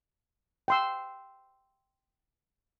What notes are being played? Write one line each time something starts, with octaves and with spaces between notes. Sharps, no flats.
G5 C6 E6